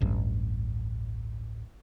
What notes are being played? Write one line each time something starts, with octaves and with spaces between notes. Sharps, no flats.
D1 A1 G2